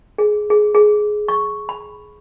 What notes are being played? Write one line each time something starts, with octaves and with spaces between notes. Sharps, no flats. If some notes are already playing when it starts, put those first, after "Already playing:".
G#4
G#4
G#4
C#6
B5